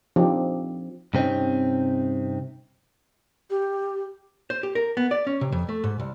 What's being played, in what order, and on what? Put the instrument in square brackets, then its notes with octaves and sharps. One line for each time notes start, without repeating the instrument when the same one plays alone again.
[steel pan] F3 C4 D4 D#4 G4
[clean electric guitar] G2 C3 C4 C#4 D#4
[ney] G4
[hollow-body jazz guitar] C5
G4
A#4
B3
D5
C#4
C3
F2
A3
G#2
C2